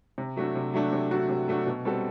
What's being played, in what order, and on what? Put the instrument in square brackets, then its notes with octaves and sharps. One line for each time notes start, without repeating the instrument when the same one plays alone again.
[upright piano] C3
F#3 A3 D4 F#4
C3
F#3 A3 D4 F#4
C3
F#3 A3 D4 F#4
C3
F#3 A3 D4 F#4
B2
G3 C4 F#4 A4